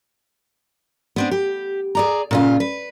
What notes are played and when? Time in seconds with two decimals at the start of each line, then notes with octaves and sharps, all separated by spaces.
1.16 B3 C4 D4
1.31 G4
1.95 G#4 D5 A#5
2.31 A#2 C#3 F4
2.60 B4